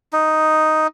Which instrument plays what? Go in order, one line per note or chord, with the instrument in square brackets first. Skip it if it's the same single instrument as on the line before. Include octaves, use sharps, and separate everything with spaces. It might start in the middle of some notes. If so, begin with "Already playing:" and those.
[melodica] D#4